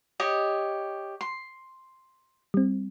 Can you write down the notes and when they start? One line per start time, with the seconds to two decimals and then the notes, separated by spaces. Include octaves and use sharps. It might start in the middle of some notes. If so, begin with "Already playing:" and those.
0.20 G4 C#5 D#5
1.21 C6
2.54 G3 C4